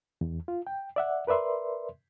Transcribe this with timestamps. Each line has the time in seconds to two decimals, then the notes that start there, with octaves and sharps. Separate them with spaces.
0.21 E2
0.48 F4
0.67 G5
0.96 D5 E5 F#5
1.27 A#4 B4 D5 E5 C6